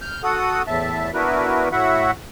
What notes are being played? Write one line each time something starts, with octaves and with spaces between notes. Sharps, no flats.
F6 G6
F#4 A4 F#5 D#6
E2 A2 E5 A5
B3 D4 E4 F#4 A#4 B4
A2 E4 F#4 E5 F#5